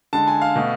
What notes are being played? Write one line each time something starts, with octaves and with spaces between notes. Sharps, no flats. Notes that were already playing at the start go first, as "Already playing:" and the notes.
D3 G#3 A5
G#5
F5
B2 A3